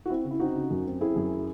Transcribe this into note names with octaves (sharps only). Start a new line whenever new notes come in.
F#4
C4 E4
C#3
E4
C4 D#4 F#4
C#3
F#2
C4
C4 E4 G#4
F#2